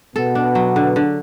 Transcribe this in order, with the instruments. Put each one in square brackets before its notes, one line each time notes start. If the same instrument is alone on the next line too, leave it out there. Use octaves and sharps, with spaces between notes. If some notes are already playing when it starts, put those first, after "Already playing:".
[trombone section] B2 B3 [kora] A4
[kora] D4
F#3
D3
D3